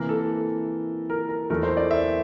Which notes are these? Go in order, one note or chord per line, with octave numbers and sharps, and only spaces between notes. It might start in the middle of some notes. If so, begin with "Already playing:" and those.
Already playing: C3 E3 A#3 A#4
A4
A#4
A#4
E2 E3 A3 A#4
C5
D5
E5